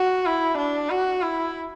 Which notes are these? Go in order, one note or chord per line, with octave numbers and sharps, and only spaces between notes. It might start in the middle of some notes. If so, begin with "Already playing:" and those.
Already playing: F#4
E4
D4
F#4
E4